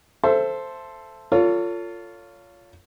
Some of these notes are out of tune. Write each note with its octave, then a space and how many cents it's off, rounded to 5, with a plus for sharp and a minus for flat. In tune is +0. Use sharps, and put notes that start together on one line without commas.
A4 +0 C5 +0 E5 +30
F4 +0 A4 +35 C#5 +30